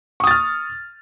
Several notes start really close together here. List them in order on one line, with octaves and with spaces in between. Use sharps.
C#6 D#6 A6 F6